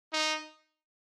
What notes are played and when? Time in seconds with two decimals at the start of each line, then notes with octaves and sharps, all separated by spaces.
0.13 D#4